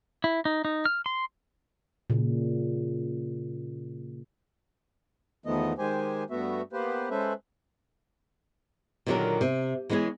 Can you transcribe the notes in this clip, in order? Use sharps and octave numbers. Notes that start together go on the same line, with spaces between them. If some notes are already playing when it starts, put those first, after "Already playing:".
E4
D#4
D#4
F6
C6
A#2 C#3
E2 D#3 F3 A3 B3 D#5
D#3 G#3 G4 C5 G#5
G2 A3 B3 F#4 E5
A#3 B3 G4 B4 C5
G#3 C#4 A4 B4 C5 E5
A#2 D3 D#3 F#3 G4 A#4
C3
E3 G#3 B3 C#4 G#4